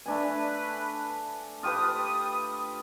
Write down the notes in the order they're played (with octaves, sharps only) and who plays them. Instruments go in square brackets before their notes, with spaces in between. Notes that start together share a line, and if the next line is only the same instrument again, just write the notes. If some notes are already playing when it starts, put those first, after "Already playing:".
[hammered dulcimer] A3 D4 G#5 [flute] B4
[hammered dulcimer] F4 G4 B4 [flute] D#6